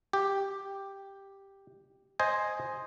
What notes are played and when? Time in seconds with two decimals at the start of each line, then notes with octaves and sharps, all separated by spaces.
0.13 G4
2.19 C5 D#5 G#5